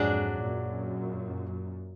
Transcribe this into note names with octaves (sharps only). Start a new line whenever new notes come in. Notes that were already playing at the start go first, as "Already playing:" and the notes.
Already playing: F2 G#2 F#3 D4 G#4 D5
F#2 A#2